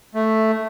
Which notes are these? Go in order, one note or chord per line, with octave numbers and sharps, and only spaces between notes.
A3